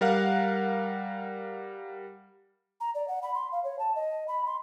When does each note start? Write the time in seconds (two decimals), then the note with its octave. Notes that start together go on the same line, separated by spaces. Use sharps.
0.01 G3 A#4 F5 F#5
2.81 A#5
2.95 D5
3.08 F#5
3.23 B5
3.35 C6
3.52 F5
3.64 C#5
3.79 A5
3.96 D#5
4.28 B5
4.46 C6